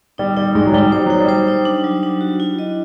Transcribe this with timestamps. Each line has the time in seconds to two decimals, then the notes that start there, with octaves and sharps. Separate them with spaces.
0.18 G3 D#4
0.37 G3 D#4
0.55 G#2 G#3 D#4
0.67 F#3
0.73 G3 D#4
0.92 G3 C5
1.06 F#3 D#4
1.20 G3
1.29 C5
1.48 D#4
1.65 D4
1.84 F#3
2.03 D4
2.21 F#4
2.40 E4
2.59 D#5